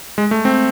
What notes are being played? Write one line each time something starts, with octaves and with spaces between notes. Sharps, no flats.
G#3
A3
C4